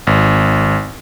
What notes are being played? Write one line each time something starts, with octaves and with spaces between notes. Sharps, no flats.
G#1